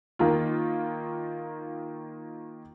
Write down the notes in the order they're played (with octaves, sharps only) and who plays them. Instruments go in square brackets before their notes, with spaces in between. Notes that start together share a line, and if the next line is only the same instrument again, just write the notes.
[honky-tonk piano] D#3 A#3 F4